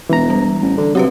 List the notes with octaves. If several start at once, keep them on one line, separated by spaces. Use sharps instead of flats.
E1 E3 A#5
G3
A1
D3
C3 F#3 C4 G4 B4